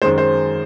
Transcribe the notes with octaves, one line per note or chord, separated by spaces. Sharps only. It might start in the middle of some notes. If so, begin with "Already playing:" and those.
F#2 D#3 G#3 C5
C5